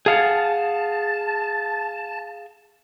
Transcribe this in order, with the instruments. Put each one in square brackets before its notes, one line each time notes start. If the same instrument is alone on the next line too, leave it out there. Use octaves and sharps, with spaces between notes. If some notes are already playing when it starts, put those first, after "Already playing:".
[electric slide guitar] G#4 F5 F#5 [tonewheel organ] A5